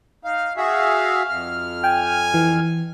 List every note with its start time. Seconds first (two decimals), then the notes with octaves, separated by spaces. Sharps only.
0.24 D#4 F5
0.57 F#4 G#4 E5 F5
1.29 F2 F6
1.84 G5 G#5
2.34 E3